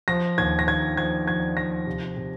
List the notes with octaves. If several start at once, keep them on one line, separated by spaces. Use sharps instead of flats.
F3 A#6
D#2 G#6
A#6
D#2 G#6
F3 G#6
F3 G#6
F3 A#6
C3
C3